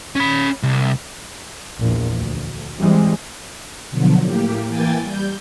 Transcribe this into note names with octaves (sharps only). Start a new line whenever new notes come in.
C#4 B5
C2
A#1 E2
D2
E3 G3 G#3 C4
B2 D3 F3 F#3
A2 A#3 G4
E3 A#3 G5 G#5 A6
G3 G6